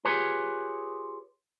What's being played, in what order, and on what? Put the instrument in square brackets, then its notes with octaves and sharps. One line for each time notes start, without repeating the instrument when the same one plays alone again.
[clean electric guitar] F4 G4 G#4 B4 C#5